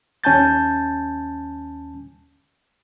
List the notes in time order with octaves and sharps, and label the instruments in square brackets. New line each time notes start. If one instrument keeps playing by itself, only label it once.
[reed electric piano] D#2 C#4 G#5 A5 G6 A6